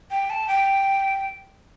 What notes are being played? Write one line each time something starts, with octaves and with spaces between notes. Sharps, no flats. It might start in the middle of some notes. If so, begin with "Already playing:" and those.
G5
A5
G5